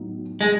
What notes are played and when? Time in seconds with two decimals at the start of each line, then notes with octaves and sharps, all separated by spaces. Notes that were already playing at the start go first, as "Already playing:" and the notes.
Already playing: A2 F#3 B3 D#4
0.41 G#3